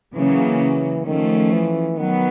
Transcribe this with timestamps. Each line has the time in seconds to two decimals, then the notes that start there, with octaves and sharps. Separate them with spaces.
0.15 C#3 E3 F#3 A#3
1.05 D#3 F3 A3 C#4
1.52 E3
1.97 D#3 F#3 B3